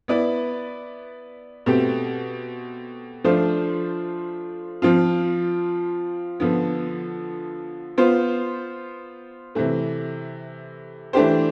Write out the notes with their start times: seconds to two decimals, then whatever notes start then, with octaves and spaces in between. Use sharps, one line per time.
0.08 B3 E4 B4 D5
1.66 B2 A3 C4 G4
3.24 F3 A3 D4 F4 C5
4.82 F3 C4 F4
6.40 D3 F3 B3
7.98 B3 F4 C5
9.55 C3 E3 A3
11.13 E3 A3 D4 G4 C5